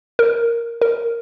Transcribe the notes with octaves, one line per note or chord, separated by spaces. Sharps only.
A#4
A#4